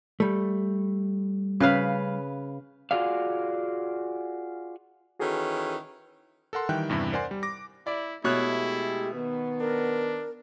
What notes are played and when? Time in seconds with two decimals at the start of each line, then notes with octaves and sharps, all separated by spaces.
0.20 G3 A3
1.60 C#3 B4 F5
2.91 F4 F#4 G#4 D5 F5
5.19 D#3 E3 C#4 F#4 G#4 A4
6.53 A4 A#4 F#5 C6
6.69 D#3 E3 G3 E5 G5 F#6
6.90 E2 G2 C3 E4
7.12 A#4 C5 D5 F#5 G#5 C6
7.31 G3
7.43 D6 A#6
7.87 E4 D5
8.24 B2 G#3 A3 E4 G4 C#5 F#6
9.13 D#3 B3
9.60 D4 A#4